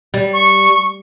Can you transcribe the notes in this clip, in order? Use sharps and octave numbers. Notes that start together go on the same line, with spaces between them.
G3
C#6